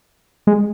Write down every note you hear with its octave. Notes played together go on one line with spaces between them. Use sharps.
G#3